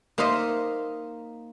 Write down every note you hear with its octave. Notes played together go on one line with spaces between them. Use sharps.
A#3 D#4 A#4 C5 D#5 E5